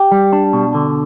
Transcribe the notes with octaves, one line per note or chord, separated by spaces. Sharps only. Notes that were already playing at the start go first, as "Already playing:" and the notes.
Already playing: G4
G3
D4
B2
D3